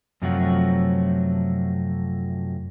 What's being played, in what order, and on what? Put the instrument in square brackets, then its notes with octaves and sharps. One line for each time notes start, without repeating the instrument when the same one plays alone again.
[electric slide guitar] F#2 C3 F3 F#3 A3 F#4